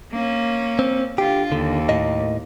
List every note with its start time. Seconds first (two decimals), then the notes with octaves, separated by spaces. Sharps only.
0.12 A#3 C#4
0.79 C4
1.18 D3 F4 G4
1.52 D#2 D3
1.89 A2 A#3 D#5